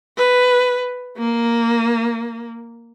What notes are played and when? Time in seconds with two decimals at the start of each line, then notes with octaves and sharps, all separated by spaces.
0.17 B4
1.17 A#3